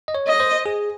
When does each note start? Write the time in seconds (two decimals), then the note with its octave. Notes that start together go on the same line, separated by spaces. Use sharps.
0.08 D#5
0.15 C#5
0.28 D#5
0.40 C5
0.66 G#4